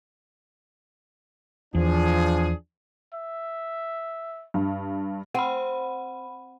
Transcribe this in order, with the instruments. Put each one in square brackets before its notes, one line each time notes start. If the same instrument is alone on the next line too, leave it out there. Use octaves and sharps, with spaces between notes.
[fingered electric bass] E2 [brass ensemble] F3 D4 G#4
[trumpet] E5
[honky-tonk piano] G2
[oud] C4 [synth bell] F#5 B5